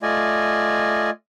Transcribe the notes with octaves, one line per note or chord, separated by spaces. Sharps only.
A3 F4 D5 D#5 G#5